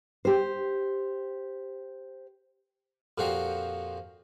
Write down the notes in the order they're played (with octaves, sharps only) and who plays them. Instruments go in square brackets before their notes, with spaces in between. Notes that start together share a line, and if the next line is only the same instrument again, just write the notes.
[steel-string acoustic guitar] G4 C5
[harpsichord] F2 A#2 F3 F#4 G4 C5